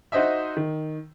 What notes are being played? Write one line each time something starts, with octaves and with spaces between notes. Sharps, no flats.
D#4 F#4 C5 D#5 E5
D#3